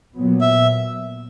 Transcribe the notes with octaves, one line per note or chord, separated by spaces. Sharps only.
A#2 F#3 B3
E5